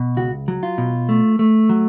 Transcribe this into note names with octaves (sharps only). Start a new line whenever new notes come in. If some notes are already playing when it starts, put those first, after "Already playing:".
Already playing: B2
C#2 F#4
F#3
F4
B2
A3
A3
F#3